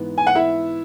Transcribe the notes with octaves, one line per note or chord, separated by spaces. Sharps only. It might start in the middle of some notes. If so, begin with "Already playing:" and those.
Already playing: G#2 E3 B3
G#5
F#5
E4 E5